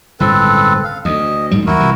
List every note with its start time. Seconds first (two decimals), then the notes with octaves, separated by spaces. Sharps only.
0.20 G1 C#2 A2 C4 A4 B4
0.84 F5
1.05 D2 D#5
1.51 A#1 G#2 G3
1.67 D#2 F#3 E4 F#4 A#4
1.80 C2 C3 E3